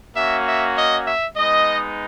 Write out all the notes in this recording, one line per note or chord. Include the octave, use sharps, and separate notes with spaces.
A#3 C#4 F#4 E5
E5
D#5
E5
G#3 B3 D#4 D#5